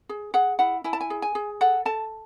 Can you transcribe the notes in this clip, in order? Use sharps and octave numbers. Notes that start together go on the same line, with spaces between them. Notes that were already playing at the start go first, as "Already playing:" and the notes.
G#4
G#4 F#5
E4 F#5
E4 G#5
A5
G#5
G#4
G#5
G#4
A4 F#5
A4 A5